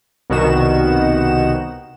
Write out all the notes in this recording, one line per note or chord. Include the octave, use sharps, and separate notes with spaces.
C2 B2 D#3 F#4 E7